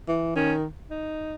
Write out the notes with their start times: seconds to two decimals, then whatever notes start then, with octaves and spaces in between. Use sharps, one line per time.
0.08 E3
0.36 D#3 C#4
0.90 D#4